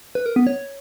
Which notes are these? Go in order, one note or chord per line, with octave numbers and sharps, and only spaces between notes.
B4
A#4
B3
C#5